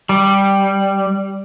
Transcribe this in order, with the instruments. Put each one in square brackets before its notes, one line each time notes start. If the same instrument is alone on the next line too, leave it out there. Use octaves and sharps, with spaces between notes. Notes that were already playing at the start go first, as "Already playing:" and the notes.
[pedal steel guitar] G3